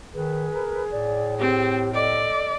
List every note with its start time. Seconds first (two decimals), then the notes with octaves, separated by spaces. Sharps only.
0.14 D#3 G#4 B4
0.54 A#4
0.91 A2 D5
1.39 C4 G4
1.94 A4 D5 D#5